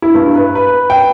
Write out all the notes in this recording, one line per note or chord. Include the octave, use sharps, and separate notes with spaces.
E4
G2
B4
B4
G5